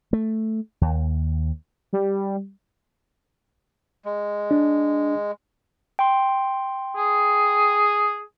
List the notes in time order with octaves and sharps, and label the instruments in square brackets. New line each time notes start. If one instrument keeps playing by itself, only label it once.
[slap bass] A3
D#2
[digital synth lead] G3
[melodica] G#3
[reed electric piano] D4
[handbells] G5 C6
[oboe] G#4